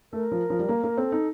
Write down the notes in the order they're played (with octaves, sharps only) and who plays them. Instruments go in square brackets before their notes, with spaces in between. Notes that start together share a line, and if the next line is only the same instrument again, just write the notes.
[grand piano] A3 [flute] A#4
[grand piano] F3
F3
G3
A#3
A#3
[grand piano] C4 [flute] A4
[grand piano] D#4